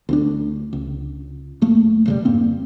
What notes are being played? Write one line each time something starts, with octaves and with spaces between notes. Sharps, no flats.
D2 C4 D4
C#2
F#1 A3 A#3
F1 C#3 G3
F2 G#2 A#3 C4